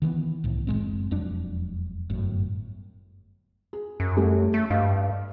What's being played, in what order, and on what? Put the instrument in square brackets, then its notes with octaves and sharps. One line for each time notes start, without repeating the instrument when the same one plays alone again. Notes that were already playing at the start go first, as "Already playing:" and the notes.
[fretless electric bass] D#3 E3 G#3 B3
C2 A2
F#1 F2 G#3 C4
E1 F2 F#3 D4
G1 F#2 A2
[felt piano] G#4
[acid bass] F#2
[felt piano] G3 A3 G4
[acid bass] A3
[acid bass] G2 [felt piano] D#5 F5